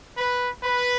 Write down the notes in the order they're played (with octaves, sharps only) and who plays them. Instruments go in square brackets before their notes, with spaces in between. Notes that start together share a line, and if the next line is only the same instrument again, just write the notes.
[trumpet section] B4
B4